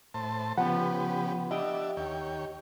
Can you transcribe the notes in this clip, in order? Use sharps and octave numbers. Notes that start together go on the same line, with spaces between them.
A2 C5 A5
C#3 F3 B3 G4 B4 F#5
D4 G4 D#5 E5
D#2 C#5 G5